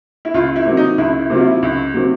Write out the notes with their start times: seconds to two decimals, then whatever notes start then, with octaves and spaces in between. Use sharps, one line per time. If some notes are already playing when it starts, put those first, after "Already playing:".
0.25 E4
0.34 C#2 F4
0.56 E4
0.66 C3 D#3 F#3
0.77 D#4
0.98 C#2 E4
1.19 E4
1.30 C3 D#3 F#3 F4
1.41 E4
1.62 C#2
1.94 C3 D#3 F#3